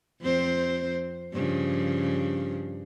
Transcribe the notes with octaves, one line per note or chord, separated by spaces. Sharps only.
F2 C4 C5
G2 C#3 F3